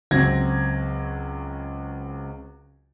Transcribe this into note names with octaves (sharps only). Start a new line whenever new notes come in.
C#2 F#3 C4 F#4 G#6 A#6